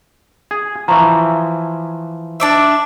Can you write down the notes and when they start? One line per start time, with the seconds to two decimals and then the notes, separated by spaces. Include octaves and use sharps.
0.51 G#4
0.88 E3 F3 A#5 C#6
2.40 D4 D5 E5